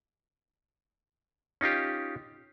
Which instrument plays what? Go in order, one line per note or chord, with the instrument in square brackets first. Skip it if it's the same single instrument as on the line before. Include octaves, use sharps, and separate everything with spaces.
[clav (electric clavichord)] C#4 D#4 F4 G4